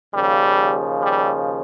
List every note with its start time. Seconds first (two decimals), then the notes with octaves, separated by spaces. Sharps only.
0.14 D#2 C#3 F3 G3
1.02 G3